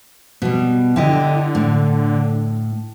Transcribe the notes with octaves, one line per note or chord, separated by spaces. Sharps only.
B2 G3
D3 E4 G4 D#5
A2